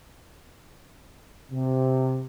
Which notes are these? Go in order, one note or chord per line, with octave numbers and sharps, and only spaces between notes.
C3